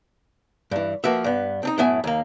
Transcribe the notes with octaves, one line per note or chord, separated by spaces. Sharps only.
G2 E3
F3 A#3 F#4 B4 E5
G2 B3
C4 D4 D#4
F#2 A2 B3 E5 G#5
D#2 A#3